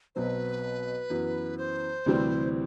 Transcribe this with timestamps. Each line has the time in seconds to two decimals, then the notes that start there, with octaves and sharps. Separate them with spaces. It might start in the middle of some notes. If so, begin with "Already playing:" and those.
0.15 B1 B2 F#3 C4 B4 C5
1.10 F#2 E3 B3
1.58 C5
2.06 D2 C3 E3 G3 C4